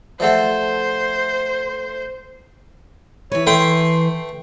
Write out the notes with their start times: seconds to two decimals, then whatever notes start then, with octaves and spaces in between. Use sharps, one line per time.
0.20 F3 A3 A4 C5 D5 E5 F#5
3.32 E3 B4 C#5
3.47 A3 G5 C6